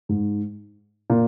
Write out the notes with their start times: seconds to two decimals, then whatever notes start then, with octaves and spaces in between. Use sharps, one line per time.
0.09 G#2
1.10 A#2